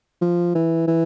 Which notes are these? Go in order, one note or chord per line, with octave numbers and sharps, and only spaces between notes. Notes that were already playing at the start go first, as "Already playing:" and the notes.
F3
E3
E3